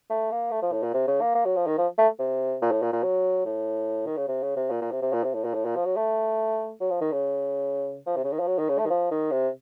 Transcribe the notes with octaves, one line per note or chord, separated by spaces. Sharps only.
A3
A#3
A3
F3
A2
A#2
C3
C#3
A#3
A#3
F#3
F3
D#3
F3
A3
C3
A#2
A2
A#2
A#2
F#3
A2
D#3
C#3
C3
C#3
C3
A#2
A#2
C3
C3
A#2
C3
A2
A#2
A2
A#2
F3
F#3
A3
F#3
F3
D#3
C#3
F3
C3
C#3
D#3
F3
F#3
D#3
C#3
A3
D#3
F3
D#3
C3